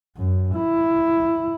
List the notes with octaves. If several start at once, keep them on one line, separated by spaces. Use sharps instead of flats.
F#2
E4